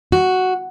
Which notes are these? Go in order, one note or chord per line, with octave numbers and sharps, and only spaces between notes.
F#4